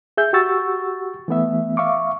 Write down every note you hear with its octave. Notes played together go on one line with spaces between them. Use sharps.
G#4 E5 G6
F#4 G4 F#5 C#6 E6 A6
E3 A3 B3 E5
E5 F5 C#6 D6